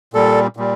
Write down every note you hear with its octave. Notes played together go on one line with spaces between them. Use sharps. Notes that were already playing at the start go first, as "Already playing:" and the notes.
A#2 G3 A4
A#2 G3